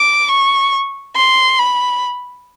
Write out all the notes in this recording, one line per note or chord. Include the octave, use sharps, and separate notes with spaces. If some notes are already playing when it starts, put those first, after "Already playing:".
Already playing: D6
C#6
C6
B5